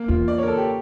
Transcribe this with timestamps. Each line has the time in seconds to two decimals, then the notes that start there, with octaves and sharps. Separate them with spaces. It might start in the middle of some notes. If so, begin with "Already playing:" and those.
Already playing: A#3
0.08 E2 F4
0.28 D5
0.38 A#4 C#5
0.47 A4
0.57 G4